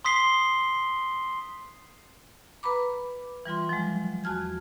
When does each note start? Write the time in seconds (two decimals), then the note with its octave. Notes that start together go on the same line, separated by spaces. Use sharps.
0.05 C6 D#6 B6 C7 G7
2.63 B4 A#5 B5 D6
3.46 E3 G3 F4 C6
3.69 F3 F#3 G#3
4.24 E2 F#4 A5 F6 G#6